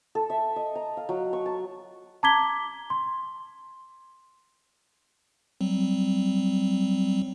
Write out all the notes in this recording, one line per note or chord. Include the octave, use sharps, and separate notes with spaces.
A4
E5
D#5
A#5
F5
F#3
C#6
A5
A5 A#5 D6 G#6 B6 G7
C6
F#3 G3 C4